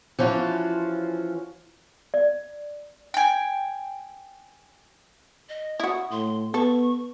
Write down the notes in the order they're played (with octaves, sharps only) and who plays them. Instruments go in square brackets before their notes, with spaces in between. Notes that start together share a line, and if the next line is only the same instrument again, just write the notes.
[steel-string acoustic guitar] E3 F3 C#4 F4 F#4
[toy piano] D5
[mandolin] G5 G#5
[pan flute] D#5
[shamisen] E4 F#4 [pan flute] D#6
[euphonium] A2 [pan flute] C6
[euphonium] B3 [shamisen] A4 [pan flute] C#6